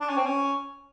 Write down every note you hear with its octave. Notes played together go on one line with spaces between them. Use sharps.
D4
C#4
C4
C#4